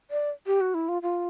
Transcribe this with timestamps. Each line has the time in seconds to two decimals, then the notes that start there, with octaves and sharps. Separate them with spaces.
0.11 D5
0.47 G4
0.61 F#4
0.74 E4
0.89 F4
1.02 F4